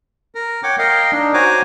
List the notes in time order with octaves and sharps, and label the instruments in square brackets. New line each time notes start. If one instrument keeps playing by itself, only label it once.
[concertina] A#4
C#5 F#5 G5 D6
A#4 D#5 F5 G5
D4 D#4
F#4 C5 C#5 G#5 A#5 D6